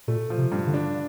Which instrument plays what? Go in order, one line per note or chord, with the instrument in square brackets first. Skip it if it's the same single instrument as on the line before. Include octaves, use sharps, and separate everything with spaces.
[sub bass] A#2 [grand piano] A3
[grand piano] F3
[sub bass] C3
[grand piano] G2
[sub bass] D3
[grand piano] D4